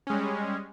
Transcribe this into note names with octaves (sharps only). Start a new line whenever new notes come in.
G3 G#3 C#4